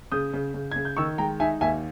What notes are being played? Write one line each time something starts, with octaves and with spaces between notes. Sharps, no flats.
C#3 D#6 G6
C#3
C#3
C#3 G#6
G6
D#3 C#6 E6
G#3 G5 A#5
D#4 E5 G#5
D#2 E5 G#5